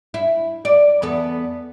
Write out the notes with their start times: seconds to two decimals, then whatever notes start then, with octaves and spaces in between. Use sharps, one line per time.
0.14 E4
0.65 D5
1.02 E2 B3 A4